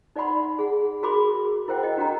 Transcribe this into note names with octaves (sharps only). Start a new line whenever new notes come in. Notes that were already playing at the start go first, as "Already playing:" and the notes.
D#4 D5 E5 F#5 B5 C6
G#4 F#5
F#4 G#4 A#4 B5 C6 D6
E4 A#4 C5 F#5 G5
D#5 G5
D4 F#4 D#5 F#5 G5 A#5